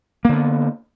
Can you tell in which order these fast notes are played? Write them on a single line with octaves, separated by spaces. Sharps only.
A#3 D3 B3